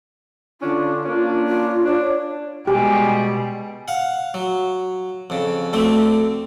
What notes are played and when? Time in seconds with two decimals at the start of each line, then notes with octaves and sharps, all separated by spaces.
0.61 D3 C#4 D4 F4
1.03 A#3 C#4 D4
1.48 F4
1.85 D4 C#5
2.67 B2 G3 G#3 G4 G#5
3.88 F5 F#5
4.34 F#3
5.30 F2 C#3
5.73 D2 D3 A3 C4